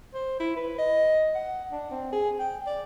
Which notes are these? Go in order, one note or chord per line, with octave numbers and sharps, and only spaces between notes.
C5
E4
B4
D#5
F#5
D4
C4
G#4
G5
D5